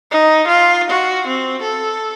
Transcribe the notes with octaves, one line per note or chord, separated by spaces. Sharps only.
D#4
F4
F#4
C4
A4